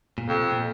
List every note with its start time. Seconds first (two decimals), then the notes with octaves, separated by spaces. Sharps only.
0.18 A#2
0.28 F2 C3
0.51 A#2